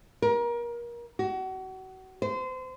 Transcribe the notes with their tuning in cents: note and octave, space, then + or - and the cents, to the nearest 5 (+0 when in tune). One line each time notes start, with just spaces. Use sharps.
A#4 +30
F#4 +30
C5 -30